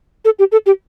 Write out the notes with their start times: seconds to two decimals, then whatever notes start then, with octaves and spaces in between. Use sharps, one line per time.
0.25 A4
0.39 G4
0.52 A4
0.66 G4